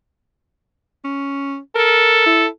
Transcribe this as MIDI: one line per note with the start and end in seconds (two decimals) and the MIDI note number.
1.04 1.58 61
1.76 2.46 69
1.76 2.24 70
2.26 2.48 64